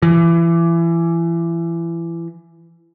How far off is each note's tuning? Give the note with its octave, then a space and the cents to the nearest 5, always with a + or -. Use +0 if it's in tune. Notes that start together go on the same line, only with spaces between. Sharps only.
E3 +25